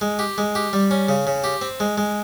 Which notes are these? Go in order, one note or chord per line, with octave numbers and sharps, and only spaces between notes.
G#3
G4
G#3
G4
G3
C#4
C#3
C#3
G4
C4
G#3
G#3